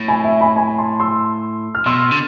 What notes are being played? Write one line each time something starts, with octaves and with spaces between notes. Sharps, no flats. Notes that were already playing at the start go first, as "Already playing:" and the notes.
Already playing: A2
G#5 B5
E5 G#5
G#5 B5
G#5 B5
A5 C6
C6 E6
F6
B2 C6 E6
D3